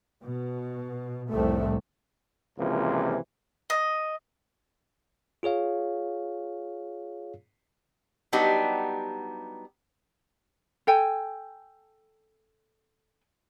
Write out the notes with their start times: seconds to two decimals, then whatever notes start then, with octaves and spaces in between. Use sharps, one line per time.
0.22 B2
1.30 F1 C2 A2 C3 A3
2.58 G#1 C#2 C3 E3 F3 A#3
3.70 D#5
5.43 F4 G#4 C#5 F5
8.33 F#3 G3 B3 D4 D#4 G4
10.87 A4 G5 G#5